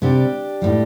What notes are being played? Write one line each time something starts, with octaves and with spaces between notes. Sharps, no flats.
C3 G3 D4 G4
A2 G3